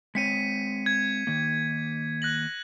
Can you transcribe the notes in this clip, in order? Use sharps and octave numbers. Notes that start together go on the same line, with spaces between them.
G#3 C4 C#5 B6 C#7 D#7
G#6
D#3 A#3
F#6 A#6 F#7